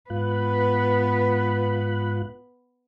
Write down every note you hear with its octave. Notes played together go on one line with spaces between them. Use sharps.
G#2 B3 F4 B4 F#6